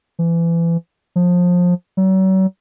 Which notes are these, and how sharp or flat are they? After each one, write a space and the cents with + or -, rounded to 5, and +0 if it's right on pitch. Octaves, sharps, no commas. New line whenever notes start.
E3 +30
F3 +25
F#3 +40